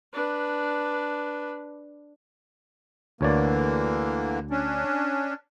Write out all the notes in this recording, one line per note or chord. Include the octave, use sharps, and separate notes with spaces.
D4 B4
D2 D3 E3 A#3 C#5 D5
C#4 D4